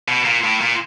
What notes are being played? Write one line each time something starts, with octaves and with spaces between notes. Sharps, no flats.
B2
A#2
A2
A#2